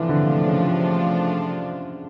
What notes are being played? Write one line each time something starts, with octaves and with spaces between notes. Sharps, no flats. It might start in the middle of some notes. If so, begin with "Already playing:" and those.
Already playing: C3 E3 F3 A3 D4 F4
D3
C#3